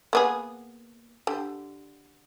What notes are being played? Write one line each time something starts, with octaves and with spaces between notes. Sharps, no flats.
A#3 B3 G#4
D3 G4